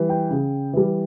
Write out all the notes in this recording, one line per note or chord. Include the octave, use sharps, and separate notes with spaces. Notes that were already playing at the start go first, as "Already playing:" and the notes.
Already playing: E3 G3
G5
C#3
E3 G3